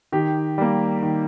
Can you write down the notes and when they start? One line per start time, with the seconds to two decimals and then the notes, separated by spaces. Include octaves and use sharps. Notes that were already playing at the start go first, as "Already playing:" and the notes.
0.12 D#3 G4
0.58 G3 A#3
1.03 D#3